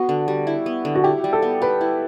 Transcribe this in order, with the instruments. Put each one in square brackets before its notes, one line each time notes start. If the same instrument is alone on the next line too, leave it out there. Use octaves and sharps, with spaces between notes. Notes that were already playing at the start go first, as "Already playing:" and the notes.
Already playing: [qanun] B3 [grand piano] F#4
[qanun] D3
G3
E4
B3
D3
[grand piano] F#4
[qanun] E4 [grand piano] G4
[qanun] G3
[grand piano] A4
[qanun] B3
[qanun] G4 [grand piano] B4
[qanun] E4